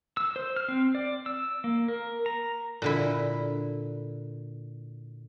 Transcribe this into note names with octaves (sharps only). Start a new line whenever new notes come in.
E6
C5
F6
C4
D5
E6
A#3
A#4
A#5
A#2 D3 E4